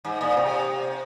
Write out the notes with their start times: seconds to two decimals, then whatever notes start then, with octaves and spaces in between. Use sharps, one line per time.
0.05 G#2
0.21 A#2
0.37 C3